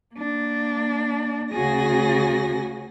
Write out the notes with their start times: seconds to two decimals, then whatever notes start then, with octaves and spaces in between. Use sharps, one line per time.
0.14 A#3 D4
1.51 D2 C#3 F#4 G#4 G#5 A#6